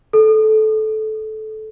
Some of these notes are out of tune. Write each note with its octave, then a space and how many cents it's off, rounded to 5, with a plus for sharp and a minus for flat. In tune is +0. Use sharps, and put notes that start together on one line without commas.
A4 -20